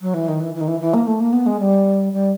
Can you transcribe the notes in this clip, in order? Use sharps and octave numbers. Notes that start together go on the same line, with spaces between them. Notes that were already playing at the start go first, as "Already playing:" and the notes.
F#3
E3
D#3
E3
E3
D#3
E3
E3
A#3
A3
A#3
B3
G#3
G3
G3